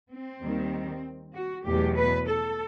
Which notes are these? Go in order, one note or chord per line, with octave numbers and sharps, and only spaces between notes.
C4
D#2 D#3 G3
F#4
E2 B2 F#3 A3 G4
B4
A4